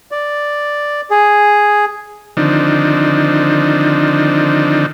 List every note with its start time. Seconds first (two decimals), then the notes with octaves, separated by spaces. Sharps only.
0.11 D5
1.10 G#4
2.37 D3 D#3 F3 C4 D4 D#4